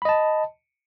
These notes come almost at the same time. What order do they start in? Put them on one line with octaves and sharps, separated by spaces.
B5 D#5 A5